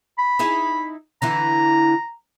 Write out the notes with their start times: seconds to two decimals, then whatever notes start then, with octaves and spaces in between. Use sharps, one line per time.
0.18 B5
0.39 D#4 E4 G#4
1.22 D3 E3 E4 A#5